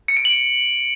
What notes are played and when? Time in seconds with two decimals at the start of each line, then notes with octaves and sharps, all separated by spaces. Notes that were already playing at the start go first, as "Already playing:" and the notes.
0.08 C#7
0.17 D7
0.25 F#7